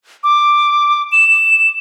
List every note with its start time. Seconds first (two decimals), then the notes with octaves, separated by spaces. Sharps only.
0.24 D6
1.12 E7